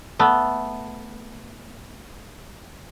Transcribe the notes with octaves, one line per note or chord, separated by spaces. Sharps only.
A3 B3